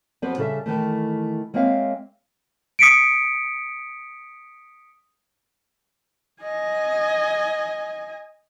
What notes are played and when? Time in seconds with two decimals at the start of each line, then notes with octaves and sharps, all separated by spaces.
0.22 F2 F#3 B3 G4 B4 C5
0.38 C#3 G3 A4 D#5 E5
0.66 D#3 E3 A3
1.54 G#3 A#3 C4 C#5 E5 F5
2.79 D#6 B6 C#7 D7
6.42 D#5 G#5